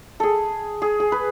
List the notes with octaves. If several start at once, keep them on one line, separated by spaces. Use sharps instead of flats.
G#4 A4
G#4
G#4
B4